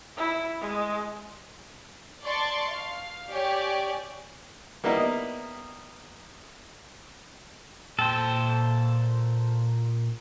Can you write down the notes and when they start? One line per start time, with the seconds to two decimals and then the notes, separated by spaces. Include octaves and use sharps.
0.17 E4
0.61 G#3
2.22 D5 A5 C6 C#6
2.71 F5
3.29 G4 C#5 D5 G#5
4.84 G3 A#3 B3 D#4 E4
7.99 A#2 A4 C5 G5